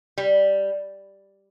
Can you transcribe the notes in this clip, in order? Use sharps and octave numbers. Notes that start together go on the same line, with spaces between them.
G3